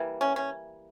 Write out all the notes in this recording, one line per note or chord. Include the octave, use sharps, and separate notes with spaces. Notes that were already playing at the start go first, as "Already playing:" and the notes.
Already playing: E3 G3 A#3
C#4
C#4